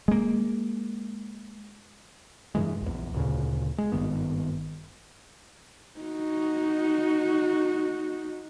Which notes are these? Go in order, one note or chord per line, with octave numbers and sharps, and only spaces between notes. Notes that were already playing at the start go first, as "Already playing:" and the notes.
G#3 A#3
G2 C3 E3 G#3
A#1 E2
D2 A#2 C#3
G#3
G#1 G2 D#3 B3
D#4 F#4